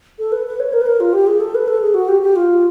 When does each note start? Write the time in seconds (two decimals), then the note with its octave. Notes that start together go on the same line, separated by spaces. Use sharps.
0.19 A4
0.32 B4
0.47 B4
0.60 C#5
0.73 A#4
0.81 B4
0.86 A#4
1.00 F4
1.13 G4
1.27 G#4
1.40 A4
1.55 B4
1.68 A4
1.82 G#4
1.94 F#4
2.08 G4
2.22 G4
2.36 F4